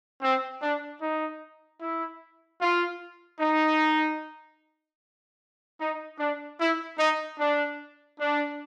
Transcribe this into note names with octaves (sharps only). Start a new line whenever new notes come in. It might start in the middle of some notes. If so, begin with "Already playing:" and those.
C4
D4
D#4
E4
F4
D#4
D#4
D4
E4
D#4
D4
D4